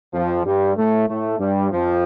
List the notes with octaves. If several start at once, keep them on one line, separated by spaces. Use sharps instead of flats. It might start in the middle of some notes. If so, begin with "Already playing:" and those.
F2 F3
G2 G3
A2 A3
A2 A3
G2 G3
F2 F3